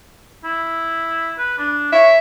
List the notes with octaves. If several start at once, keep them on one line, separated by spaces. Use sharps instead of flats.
E4
B4
D4
C#5 E5